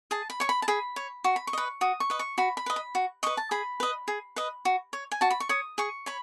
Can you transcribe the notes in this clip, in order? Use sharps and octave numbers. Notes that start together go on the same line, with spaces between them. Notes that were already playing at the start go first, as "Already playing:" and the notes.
G#4 A5
B5
C#5 C#6
B5
A5
G#4 B5
C#5
F#4 C#6
B5
C#6
B4 D#5
F#4 D#6
C#6
B4 D#5
C#6
F#4 B5
B5
B4 D#5
B5
F#4
B4 D#5 C#6
A5
G#4 B5
B4 D#5
G#4
B4 D#5
F#4
C#5
G#5
F#4 A5
B5
C#6
C#5 D#6
G#4 C#6
C#5 B5